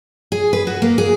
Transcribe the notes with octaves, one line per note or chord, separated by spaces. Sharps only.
G#4
B4
F#4
A#3
G#4